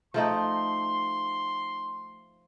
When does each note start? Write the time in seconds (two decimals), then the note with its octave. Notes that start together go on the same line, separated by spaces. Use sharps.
0.14 F3 A3 D#4 C6